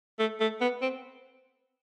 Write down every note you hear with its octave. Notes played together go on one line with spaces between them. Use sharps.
A3
A3
B3
C4